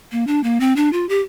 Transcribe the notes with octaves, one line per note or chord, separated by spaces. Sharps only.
A#3
D4
A#3
C4
D4
F4
G4